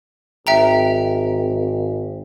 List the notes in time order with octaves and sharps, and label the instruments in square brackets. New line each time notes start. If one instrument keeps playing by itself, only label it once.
[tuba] G#1 [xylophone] E5 G5 A#5